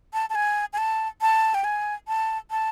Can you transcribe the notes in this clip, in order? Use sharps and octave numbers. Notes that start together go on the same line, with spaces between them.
A5
A5
G#5
G#5
A5
A5
G5
G#5
A5
A5